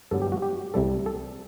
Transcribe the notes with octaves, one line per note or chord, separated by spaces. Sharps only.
G2 D3 F#3 B3 A4
G4
F#4
G4
C2 C3 G3 A4
A4